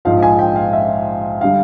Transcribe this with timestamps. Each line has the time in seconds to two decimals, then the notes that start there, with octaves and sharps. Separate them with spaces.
0.05 A#1 G#2 F3 F5
0.23 G#5
0.39 G5
0.56 F5
0.73 E5
1.41 D3 G3 F5